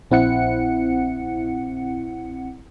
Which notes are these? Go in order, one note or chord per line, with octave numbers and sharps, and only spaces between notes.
A#1 C4 E4 F#5 C#7